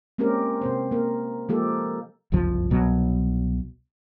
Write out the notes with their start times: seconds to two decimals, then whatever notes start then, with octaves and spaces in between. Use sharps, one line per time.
0.18 G#3 A#3 C4 C#4 G4 A#4
0.61 C3 C4 C5
0.91 A#3 A#4
1.49 F3 G#3 A#3 G4 A4
2.32 F#1 C2 F2 F3
2.70 C2 B2 F#3